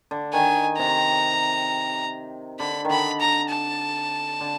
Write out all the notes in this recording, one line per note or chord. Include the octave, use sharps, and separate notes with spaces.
D3
D#3 G#5
C3 A#5
D3 B5
D#3
D3 B5
A#5
A5
D3